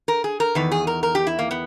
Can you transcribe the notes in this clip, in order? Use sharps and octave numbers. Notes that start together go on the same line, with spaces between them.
A#4
G#4
A#4
E2 D#3 B4
G#4
A#4
A#4
G4
E4
A#3
B3